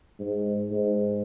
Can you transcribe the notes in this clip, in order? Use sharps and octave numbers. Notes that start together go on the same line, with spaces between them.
G#2
G#2